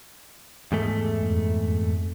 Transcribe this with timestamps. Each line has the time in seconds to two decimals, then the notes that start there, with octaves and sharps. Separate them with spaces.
0.72 E2 G#2 A3
1.20 F2